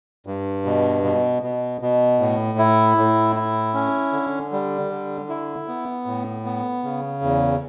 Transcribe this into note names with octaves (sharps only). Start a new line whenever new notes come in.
G2
B2
B2
B2
B2
A2
E4
A2
E4
C#4
D3
G3
D3
E4
B3
A2
B3
C#3
E2